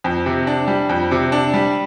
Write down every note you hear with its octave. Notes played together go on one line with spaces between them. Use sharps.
F2
C3
D4
G3
F2
C3
D4
G3